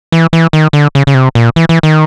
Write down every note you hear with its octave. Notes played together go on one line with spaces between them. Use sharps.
E3
E3
D#3
D3
C#3
C#3
C3
A#2
E3
E3
D#3